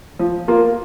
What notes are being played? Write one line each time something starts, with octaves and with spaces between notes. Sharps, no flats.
F3
A#3 F4 A#4